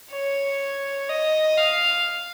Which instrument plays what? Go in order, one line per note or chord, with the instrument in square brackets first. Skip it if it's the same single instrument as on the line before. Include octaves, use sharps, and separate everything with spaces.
[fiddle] C#5
D#5
F5